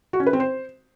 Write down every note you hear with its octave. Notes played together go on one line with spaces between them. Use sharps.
F#4
C#4
B4
C4
C5